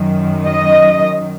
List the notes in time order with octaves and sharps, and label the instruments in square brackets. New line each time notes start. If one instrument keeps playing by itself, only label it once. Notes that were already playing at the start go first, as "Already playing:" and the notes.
Already playing: [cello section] F#2 D#3 F#3
D#5